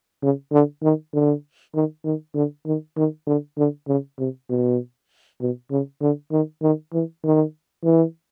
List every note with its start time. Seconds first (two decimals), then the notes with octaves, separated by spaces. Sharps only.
0.22 C#3
0.52 D3
0.83 D#3
1.14 D3
1.74 D#3
2.05 D#3
2.35 D3
2.66 D#3
2.97 D#3
3.27 D3
3.58 D3
3.88 C#3
4.19 C3
4.49 B2
5.41 B2
5.71 C#3
6.02 D3
6.32 D#3
6.63 D#3
6.93 E3
7.24 D#3
7.84 E3